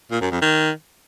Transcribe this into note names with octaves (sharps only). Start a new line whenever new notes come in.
A#2
F#2
F2
D#3